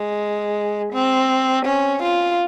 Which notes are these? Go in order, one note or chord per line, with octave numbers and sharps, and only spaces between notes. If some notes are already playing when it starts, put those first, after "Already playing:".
Already playing: G#3
C4
C#4
F4